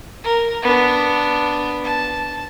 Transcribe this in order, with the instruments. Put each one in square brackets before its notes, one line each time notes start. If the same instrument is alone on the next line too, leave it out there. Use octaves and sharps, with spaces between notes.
[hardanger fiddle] A#4
B3 D4
A5